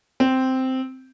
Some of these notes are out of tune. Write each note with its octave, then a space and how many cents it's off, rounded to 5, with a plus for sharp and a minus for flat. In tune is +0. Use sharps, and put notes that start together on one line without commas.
C4 -5